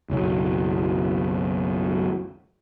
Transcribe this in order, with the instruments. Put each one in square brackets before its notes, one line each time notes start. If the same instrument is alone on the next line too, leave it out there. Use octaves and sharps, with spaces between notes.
[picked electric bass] F#1 B1 F#2